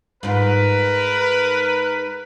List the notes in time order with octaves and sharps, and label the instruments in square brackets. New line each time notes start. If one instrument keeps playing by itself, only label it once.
[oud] G#2 F4 [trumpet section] A#4 B4